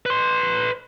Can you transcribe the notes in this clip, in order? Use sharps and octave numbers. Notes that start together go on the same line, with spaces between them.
B4 C6